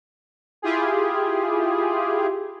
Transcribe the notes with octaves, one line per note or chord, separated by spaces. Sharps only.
E4 F4 G4 G#4